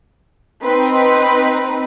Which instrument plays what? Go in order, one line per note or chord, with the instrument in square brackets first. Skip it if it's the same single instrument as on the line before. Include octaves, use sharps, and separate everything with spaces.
[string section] C4 D#4 B4